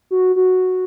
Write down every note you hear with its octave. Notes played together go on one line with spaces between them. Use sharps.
F#4
F#4